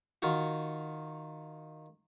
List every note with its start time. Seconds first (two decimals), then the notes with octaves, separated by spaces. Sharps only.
0.22 D#3 F4 F#4